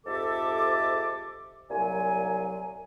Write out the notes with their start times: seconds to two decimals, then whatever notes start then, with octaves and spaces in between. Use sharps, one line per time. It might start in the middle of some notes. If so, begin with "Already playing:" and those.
0.07 F2 G#2 G4 A4 E5 D6
1.71 C2 A#2 F#3 G#5